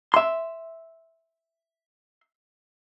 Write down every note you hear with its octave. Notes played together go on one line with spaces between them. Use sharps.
E5 C6